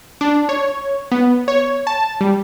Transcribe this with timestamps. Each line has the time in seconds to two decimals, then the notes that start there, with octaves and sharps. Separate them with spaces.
0.21 D4
0.49 C#5
1.11 B3
1.48 C#5
1.87 A5
2.21 G3